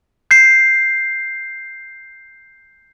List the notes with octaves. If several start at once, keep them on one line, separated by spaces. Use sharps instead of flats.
G6 C7